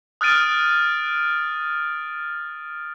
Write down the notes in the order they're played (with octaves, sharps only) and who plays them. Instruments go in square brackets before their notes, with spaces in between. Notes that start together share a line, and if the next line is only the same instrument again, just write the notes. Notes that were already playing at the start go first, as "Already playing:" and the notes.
[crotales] D#6 F6 F#6 A6 D7 D#7